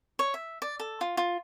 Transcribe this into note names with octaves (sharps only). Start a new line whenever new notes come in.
C#5
E5
D5
A4
F4
F4